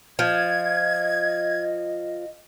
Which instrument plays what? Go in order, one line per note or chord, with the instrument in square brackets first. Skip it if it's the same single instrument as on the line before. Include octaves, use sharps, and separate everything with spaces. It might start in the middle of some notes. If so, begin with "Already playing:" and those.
[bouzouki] F3 [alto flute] D#5 [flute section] G#6